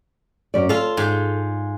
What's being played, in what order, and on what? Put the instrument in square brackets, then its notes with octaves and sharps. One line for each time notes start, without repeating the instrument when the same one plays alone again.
[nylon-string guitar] F#2 D5
[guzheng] F4 F5 [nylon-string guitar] A4
[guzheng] G#2